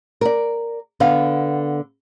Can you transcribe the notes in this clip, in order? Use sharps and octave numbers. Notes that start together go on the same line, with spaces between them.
A#4 D5
D3 B3 F5